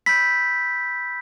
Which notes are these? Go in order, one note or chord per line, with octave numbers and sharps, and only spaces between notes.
B5 E6 G6 B6